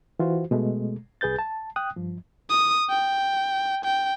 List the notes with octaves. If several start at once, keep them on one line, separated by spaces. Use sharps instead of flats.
E3 F4 F#4 C5
B2 G#3 A3
C2 G#4 B4 G6 A6
A5
G5 D#6 F#6
G2 F3
D#6
G5
G5